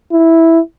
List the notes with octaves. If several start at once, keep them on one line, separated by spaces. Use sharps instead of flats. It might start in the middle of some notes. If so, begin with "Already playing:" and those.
E4